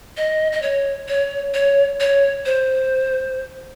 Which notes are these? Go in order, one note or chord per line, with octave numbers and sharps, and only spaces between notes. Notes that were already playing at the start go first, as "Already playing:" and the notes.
D#5
D#5
C#5
C#5
C#5
C#5
C5